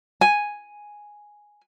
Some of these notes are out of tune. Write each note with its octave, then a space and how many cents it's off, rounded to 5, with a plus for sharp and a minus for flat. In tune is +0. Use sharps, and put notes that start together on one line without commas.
G#5 +0